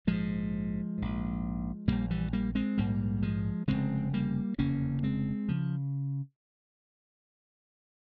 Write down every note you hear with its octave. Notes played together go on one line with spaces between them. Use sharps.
A#1 G#2 F3 G#3
A#1 G#2
A#1 G#2 G3 A#3
E3 G3
G3 A#3
G#3 C4
A#1 G#2 G3 A#3
F3 G#3
F1 E2 C#3 G#3 C4
G3 A#3
F1 E2 C#3 A#3 C#4
G#3 C4
C#3 F3